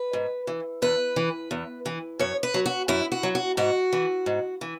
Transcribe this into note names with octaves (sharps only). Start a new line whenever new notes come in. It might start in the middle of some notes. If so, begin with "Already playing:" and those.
Already playing: B4
G#2
E3
E2 B4
E3
E2
E3
F#2 C#5
B4
F#3
F#4
F#2 E4
F#4
F#3
F#4
G#2 F#4
E3
G#2
E3